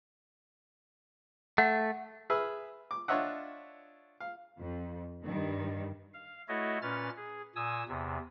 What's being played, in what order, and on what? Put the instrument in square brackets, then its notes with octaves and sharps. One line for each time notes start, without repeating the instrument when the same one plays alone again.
[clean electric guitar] A3 [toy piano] F#5
[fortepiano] G#4 B4 E5 E6 F6
D6
D4 F4 C#5 D#5 E5 F#5
F5
[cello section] F2
G2 D#3
[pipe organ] F5
A3 E4 F#4 A4 C#5 D#5
A#2 C#4 B4 F6 A6
G#4
A#2 G#5 D#6 E6
E2 C3